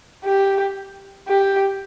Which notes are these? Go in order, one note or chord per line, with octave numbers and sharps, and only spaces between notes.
G4
G4